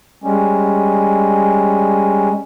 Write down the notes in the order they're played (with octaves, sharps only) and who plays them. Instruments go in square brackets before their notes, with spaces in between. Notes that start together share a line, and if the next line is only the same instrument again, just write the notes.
[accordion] G3 G#3 C#4